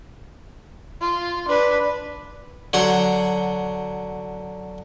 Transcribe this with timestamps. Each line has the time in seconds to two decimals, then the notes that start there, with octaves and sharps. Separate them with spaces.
1.01 F4
1.48 D4 B4
2.73 D3 F#3 A#5 C6